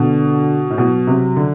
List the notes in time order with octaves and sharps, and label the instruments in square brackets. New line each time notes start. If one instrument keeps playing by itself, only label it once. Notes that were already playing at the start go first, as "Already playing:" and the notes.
Already playing: [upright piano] B2 [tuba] D3
[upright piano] A2
[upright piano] B2 [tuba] F#3
[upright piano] C3
D3